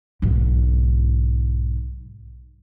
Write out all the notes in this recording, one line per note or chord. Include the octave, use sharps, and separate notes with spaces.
B1 G#2